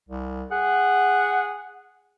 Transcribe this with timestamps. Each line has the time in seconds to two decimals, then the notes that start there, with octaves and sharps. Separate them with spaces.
0.09 C2
0.51 G#4 F#5